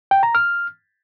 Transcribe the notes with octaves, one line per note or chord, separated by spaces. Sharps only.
G5
A#5
F6